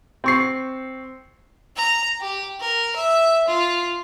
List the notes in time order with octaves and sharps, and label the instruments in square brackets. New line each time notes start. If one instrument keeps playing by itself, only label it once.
[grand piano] C4 C#6 C7
[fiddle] A#5
G4
A#4
E5
F4